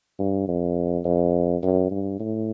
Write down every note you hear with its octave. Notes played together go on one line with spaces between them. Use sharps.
G2
F2
F2
F#2
G2
A2